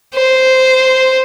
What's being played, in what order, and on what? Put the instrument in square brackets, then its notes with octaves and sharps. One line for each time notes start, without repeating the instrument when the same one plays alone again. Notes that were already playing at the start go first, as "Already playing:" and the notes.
[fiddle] C5